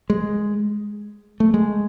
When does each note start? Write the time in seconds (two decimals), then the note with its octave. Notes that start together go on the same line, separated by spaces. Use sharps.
0.10 G#3
1.40 A3
1.54 G#3